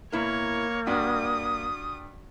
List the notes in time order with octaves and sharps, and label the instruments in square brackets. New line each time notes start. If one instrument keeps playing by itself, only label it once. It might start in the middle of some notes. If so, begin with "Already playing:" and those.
[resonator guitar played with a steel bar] B2 E4 A#4 [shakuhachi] A#3 [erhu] C#5
[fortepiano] G2 D4 [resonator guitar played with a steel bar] F#4 [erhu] D#6